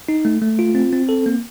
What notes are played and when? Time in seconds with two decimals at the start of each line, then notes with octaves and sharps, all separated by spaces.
0.09 D#4
0.25 A3
0.42 A3
0.59 F4
0.75 C4
0.93 C4
1.09 A4
1.26 A#3